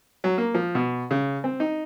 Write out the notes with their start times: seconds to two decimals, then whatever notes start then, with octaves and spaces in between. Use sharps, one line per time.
0.24 F#3
0.38 A#3
0.54 F3
0.75 B2
1.11 C#3
1.44 C4
1.60 D#4